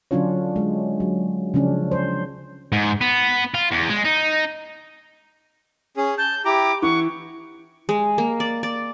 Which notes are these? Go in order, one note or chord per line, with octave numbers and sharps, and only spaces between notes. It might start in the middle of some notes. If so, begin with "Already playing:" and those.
D3 F#3 C#4 D4 F4 C#5
G#3
F#3
C#3 F3 C#4 D4
C5
G#2
B3
F4
E2
G#3
D#4
C#4 G#4
A5 G6
E4 G4 A#5 D6
E3 F#5 C#6
G#3
A#3
D5
D5